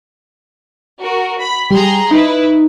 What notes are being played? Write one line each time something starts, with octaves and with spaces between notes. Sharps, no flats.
F#4 A#4
B5
G3 G#4 A#5 C6
D#4 E4 B4